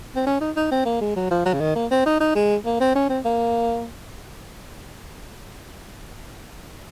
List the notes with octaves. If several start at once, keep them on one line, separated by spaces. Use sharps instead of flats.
C4
C#4
D#4
D#4
C4
A#3
G#3
F#3
F3
F#3
C#3
D#3
A#3
C4
D#4
D#4
G#3
A#3
C4
C#4
C4
A#3